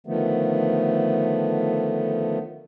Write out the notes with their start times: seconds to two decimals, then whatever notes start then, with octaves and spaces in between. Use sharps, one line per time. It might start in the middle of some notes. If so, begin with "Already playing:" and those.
0.07 D3 D#3 F3 A3 B3